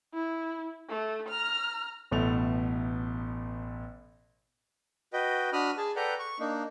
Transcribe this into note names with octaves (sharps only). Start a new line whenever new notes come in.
E4
A3
A#5 F6
A1 B2 A3 F7
F#4 B4 D#5 G5
D4 F#4 B5 D#6 F6
G#4 A5
A4 B4 D5 F#5 G5 A#5
C#6
A#3 D4 D#4